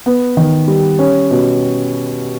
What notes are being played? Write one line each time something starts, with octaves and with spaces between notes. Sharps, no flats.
B3
D#3
G3
C#4
B2